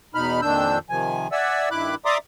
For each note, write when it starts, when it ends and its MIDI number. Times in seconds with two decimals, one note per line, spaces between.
0.15 0.41 40
0.15 0.41 47
0.15 0.41 63
0.15 0.41 83
0.15 0.41 89
0.42 0.78 41
0.42 0.78 46
0.42 0.78 51
0.42 0.78 62
0.42 0.78 88
0.42 0.78 91
0.90 1.28 48
0.90 1.28 51
0.90 1.28 53
0.90 1.28 80
1.32 1.69 74
1.32 1.69 76
1.32 1.69 78
1.32 1.69 80
1.32 1.69 88
1.71 1.95 43
1.71 1.95 51
1.71 1.95 64
1.71 1.95 83
1.71 1.95 86
1.71 1.95 90
2.05 2.18 74
2.05 2.18 76
2.05 2.18 82
2.05 2.18 84
2.05 2.18 86
2.05 2.18 87